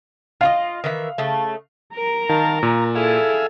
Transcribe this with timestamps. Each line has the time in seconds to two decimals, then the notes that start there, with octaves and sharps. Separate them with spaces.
0.41 F4 F#4 D#5 F5
0.84 D#3 E3 E5
1.18 C#3 A3
1.96 A#4 A#5
2.29 D#3 F5 A5
2.63 A#2 A#4
2.95 E4 G#4 A4 E5 F5